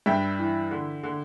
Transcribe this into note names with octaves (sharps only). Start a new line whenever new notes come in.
G2 E5 G5
E3
D3
D3